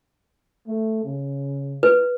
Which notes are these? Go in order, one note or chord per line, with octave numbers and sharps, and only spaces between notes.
A3
C#3
B4